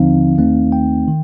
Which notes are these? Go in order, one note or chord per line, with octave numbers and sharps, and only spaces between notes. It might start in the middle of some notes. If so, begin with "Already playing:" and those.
Already playing: D#2 D3 F3 C4 D#4 F5
D#2 D#3 A3 C4 D#4
G5
D#3